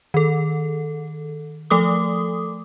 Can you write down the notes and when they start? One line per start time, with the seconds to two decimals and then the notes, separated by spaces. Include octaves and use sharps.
0.14 D#3 A4
1.70 F3 A3 A4 D6 D#6